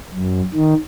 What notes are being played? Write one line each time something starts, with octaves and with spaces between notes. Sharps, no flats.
F#2
D#3